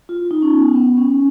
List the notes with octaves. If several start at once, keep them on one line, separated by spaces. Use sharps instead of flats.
F4
D#4
C#4
B3
B3
C#4
C#4